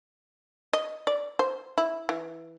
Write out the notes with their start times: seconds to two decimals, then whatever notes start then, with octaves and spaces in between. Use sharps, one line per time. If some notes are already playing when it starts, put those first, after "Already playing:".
0.73 D#5
1.07 D5
1.39 C5
1.78 E4
2.09 E3